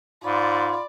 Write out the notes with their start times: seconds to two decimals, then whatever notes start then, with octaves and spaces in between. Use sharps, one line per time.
0.24 G#2 F4 D5 B5 C6